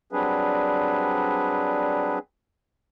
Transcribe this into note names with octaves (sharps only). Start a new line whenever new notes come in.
F#3 G3 C4 D4 G#4 B4